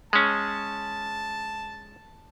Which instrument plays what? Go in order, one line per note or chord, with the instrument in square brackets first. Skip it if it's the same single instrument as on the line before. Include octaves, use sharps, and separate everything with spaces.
[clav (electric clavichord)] G#3 C#4 [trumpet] A5